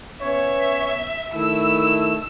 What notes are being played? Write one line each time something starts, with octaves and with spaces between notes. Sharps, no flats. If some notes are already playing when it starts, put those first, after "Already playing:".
B3 C#4 C#5 E5
D#3 A3 E4 E6